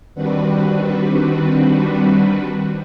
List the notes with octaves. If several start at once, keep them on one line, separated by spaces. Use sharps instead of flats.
D#3 G3 C4 D4 F#4 B4